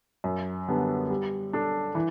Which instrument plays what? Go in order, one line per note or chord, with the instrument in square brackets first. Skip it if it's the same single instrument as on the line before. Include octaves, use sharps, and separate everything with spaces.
[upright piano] F#2
D3 G3 B3 D4
G3
D4 A4
E3